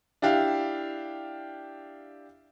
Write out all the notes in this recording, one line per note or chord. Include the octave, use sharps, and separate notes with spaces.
D4 E4 G4 F5